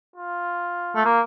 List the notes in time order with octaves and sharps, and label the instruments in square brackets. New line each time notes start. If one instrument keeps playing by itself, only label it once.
[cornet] F4
[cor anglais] A3
A#3